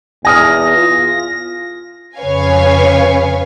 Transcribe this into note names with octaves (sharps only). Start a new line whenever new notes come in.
E2 G#5 D#6 F6 A#6
F4
F2 C#3 B4 C#5 F5 G#5